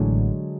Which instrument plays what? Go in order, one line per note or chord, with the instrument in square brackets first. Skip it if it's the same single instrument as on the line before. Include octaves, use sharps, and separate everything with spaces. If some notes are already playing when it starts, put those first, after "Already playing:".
Already playing: [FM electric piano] A1 A2 E3 [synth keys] D3 F#3 G#3